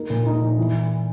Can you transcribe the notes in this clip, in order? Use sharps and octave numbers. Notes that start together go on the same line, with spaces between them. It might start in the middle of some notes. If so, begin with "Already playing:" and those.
Already playing: A#3 D#4
A#2
D#4
A#2
E3